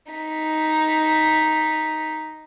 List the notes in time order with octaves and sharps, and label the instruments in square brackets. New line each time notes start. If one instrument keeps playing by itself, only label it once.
[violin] D#4 B6